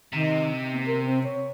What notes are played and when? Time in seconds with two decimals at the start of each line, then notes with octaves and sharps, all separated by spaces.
0.13 C3 D#3
0.73 B3
0.86 A#4
1.06 C4
1.23 C#5